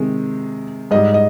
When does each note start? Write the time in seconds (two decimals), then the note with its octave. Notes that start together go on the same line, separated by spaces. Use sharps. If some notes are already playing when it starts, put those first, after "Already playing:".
Already playing: C3 D#3 G#3
0.91 G#2 G3 D#5
1.14 D#5